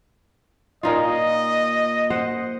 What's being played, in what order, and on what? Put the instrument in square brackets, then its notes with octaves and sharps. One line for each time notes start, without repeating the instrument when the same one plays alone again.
[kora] A#2 D#4 F4 [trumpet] D#5
[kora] C5 F#5